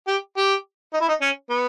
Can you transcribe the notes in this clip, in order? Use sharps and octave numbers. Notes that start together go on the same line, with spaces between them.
G4
G4
D#4
E4
D#4
C#4
B3